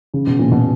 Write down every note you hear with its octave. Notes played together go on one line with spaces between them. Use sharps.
C#3
B2
A#2
B2